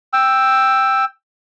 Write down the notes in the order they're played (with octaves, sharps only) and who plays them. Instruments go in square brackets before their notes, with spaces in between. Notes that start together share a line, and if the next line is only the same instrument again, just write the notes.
[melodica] G5 E6